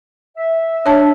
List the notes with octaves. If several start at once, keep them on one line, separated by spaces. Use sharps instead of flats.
E5
D4 C#5 A5